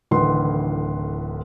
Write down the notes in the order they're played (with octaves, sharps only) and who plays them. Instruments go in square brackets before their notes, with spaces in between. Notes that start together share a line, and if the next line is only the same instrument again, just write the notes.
[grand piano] D1 D2 D#3 E3 B4 C6